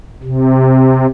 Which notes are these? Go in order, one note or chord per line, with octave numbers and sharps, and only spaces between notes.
C3